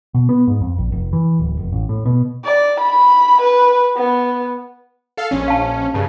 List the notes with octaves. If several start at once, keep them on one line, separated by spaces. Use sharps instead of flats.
B2
B3
G#2
F2
A#1
F1
E3
D1
F1
A1
A2
B2
D5
B5
B4
B3
A4 F5
A#1 C#4
F5 A5
G2 C#3 A5